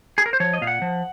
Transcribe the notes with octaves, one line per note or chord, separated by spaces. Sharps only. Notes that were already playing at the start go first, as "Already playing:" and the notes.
G#4
A#4
C5
F3 C#5
D#5
A#2 F5
F#5
F3